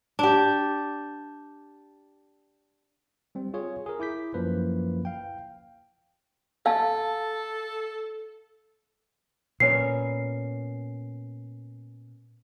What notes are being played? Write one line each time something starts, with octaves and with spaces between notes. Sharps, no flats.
D4 G4
G3 C4
F4 G#4 C#5
G#4 A#4
E4 D6 G6 B6
F#2 F3 A#3 E4 B4
F5 G5
A4 F5 A5
A#2 B3 C#4 A#4 C7